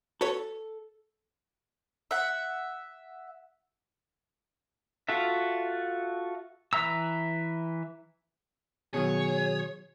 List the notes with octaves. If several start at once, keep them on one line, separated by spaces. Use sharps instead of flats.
F#4 A4 B4 C#5
E5 F#5
F4 F#4 A4 E5
E3 B4 E5 A#5 E6
B2 D#3 F#3 G#4 C#5